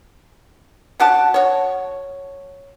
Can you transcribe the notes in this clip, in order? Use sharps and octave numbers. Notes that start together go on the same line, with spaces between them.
C#4 F#4 D5 A5
F#4 C#5